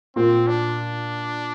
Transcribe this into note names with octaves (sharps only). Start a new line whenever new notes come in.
A#2 C4
D4